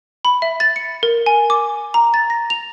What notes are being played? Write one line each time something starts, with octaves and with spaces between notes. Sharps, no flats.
B5
E5
A6
C#7
A#4
G#5
D6
A#5
A6
A#6
F7